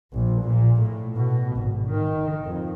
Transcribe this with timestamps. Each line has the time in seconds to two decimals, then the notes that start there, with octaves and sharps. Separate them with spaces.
0.14 A#1
0.44 A#2
0.81 A2
1.15 B2
1.55 G#1
1.88 D#3
2.45 F2